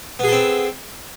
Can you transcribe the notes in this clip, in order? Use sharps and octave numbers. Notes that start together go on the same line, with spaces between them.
B3 C4 G#4 A4